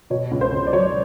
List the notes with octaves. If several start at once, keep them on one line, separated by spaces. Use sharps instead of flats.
B2 C#5
C#2
C5
C#2
D5
F#3 C#5